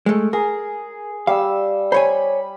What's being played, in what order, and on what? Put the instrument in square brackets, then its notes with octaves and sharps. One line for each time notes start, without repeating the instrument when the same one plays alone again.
[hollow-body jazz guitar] G#3 A3
[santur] G#4 [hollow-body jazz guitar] A#4
[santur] G3 E6 [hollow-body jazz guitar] F5
[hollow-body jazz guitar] C5 C#5 G#5 [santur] B5